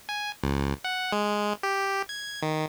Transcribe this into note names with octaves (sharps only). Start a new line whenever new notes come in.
G#5
C#2
F#5
G#3
G4
G#6
D#3